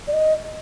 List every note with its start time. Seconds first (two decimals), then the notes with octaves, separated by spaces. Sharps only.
0.07 D5
0.13 D#5